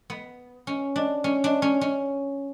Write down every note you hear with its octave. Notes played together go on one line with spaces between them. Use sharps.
B3
C#4
D4
C#4
D4
C#4
C#4